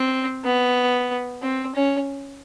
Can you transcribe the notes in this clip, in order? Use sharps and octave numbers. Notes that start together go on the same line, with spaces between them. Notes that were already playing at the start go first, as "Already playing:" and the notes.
Already playing: C4
B3
C4
C#4